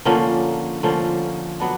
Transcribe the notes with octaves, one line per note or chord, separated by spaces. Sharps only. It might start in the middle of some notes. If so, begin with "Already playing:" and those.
D3 F3 A#3 C#4
D3 F3 A#3 C#4
F#3 B3 D4